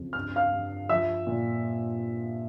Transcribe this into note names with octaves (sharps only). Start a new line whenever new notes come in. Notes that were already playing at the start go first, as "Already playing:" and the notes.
Already playing: F2 C#3
G2 F6
F5 F6
G2
F3 E5 E6
A#2